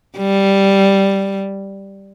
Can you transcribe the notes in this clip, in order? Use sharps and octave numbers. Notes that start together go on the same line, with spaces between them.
G3